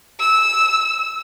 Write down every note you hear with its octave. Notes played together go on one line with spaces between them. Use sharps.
E6